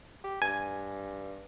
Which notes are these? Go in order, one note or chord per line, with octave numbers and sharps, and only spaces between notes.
G4
G2 G#5